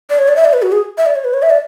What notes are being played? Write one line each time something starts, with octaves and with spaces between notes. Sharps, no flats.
D5
C#5
D5
E5
D5
B4
F#4
G#4
E5
D5
C#5
B4
C#5
E5
D5